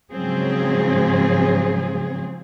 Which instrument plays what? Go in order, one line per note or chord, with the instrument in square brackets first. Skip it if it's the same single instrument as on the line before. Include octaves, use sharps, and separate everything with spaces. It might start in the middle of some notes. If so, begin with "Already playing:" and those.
[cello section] G#2 C#3 F3 F#3 C4 G#4